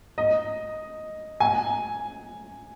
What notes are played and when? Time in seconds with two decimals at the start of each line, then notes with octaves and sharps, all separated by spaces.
0.18 D#5
1.40 G#5